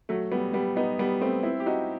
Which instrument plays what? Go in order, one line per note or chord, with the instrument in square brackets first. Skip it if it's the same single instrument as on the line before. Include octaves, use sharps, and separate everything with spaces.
[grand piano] F#3 A3
G3 B3
G3 B3
B3 D#4
G3 B3
A3 C4
C4 E4
G4
D#4 F#4